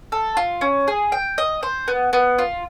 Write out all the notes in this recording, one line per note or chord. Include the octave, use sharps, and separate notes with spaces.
A4
F4
C#4
G#4
G5
D#5
C5
B3
B3
F4